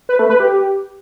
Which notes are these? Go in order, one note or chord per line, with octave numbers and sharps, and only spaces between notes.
B4
A3
B4
G4